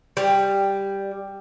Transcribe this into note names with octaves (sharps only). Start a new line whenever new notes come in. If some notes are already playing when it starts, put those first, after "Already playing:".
G3